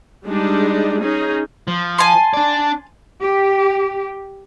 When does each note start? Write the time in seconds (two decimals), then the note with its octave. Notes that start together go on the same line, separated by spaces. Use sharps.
0.25 G3 G#3 D4 D#4
1.01 C#4 D#4 G#4
1.68 F3
1.98 G#5 A5 C6
2.34 D4 D5
3.22 G4